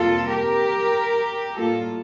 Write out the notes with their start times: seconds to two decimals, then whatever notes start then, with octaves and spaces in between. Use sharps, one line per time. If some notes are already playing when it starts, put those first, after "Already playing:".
Already playing: F2 C3 G3 A#3 F4 A4
0.27 G4 A#4
1.55 A2 G3 A#3 F4 A4